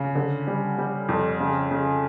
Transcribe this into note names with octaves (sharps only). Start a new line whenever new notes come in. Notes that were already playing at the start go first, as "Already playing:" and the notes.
Already playing: C#3
D3
G3
G3
F2
C#3
C#3